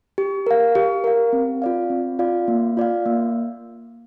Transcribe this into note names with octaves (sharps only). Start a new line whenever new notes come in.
G4
A#4 F5
G4
A#4 F5
C4
F4 D5 F5
C4
F4 D5 F5
A#3
F4 D5 F5
A#3